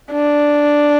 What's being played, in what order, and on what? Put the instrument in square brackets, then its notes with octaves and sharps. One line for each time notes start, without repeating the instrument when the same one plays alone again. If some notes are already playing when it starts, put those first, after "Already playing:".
[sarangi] D4